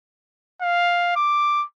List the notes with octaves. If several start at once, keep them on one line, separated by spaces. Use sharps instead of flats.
F5
D6